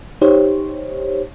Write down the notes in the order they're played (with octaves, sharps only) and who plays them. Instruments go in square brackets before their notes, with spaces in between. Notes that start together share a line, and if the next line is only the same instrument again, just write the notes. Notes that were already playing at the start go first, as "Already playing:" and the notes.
[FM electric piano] D#4 G4 C5 C#5